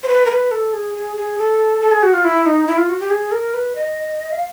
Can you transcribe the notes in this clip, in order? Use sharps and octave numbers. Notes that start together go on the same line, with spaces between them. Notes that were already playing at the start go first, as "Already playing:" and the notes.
C5
B4
A#4
B4
A4
G#4
G#4
G#4
A4
A4
G#4
F#4
F4
E4
D#4
E4
F4
F#4
G4
G#4
A#4
B4
D#5
F5